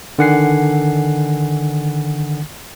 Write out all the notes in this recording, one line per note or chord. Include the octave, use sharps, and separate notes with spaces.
D3 D#3 F#5 G#5 C7